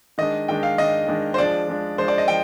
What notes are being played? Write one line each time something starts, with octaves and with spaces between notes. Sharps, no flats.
D#3 G#3 D4 D#5
D#3 G#3 D4 G5
F5
D#3 G#3 D4 D#5
D#3 G#3 D4
C5
F3 G#3 D4 D5
F3 G#3 D4
F3 G#3 D4 C5
D5
D#5
F3 G5